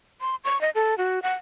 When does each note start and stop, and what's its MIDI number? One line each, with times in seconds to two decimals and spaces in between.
0.21 0.35 84
0.44 0.60 85
0.61 0.70 75
0.75 0.97 69
0.98 1.22 66
1.22 1.34 78